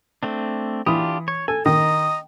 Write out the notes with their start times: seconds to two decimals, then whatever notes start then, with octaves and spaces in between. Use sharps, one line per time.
0.23 A3 C4 D4
0.86 E3 D4 F4 G4 B5 D#6
1.28 C#5
1.48 A4 G#5
1.66 D#3 D#5 A#5